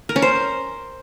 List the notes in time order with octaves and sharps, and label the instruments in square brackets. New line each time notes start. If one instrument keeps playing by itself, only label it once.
[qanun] A#4
C#4
C5